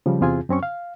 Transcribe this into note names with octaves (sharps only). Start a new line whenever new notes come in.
C#3 F3 G3
E2 C3 C4 F4 G#4 G#5
F#2 C4 C#4 C#6
F5